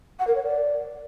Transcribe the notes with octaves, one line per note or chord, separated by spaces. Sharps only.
F#5
A#4
C#5
D5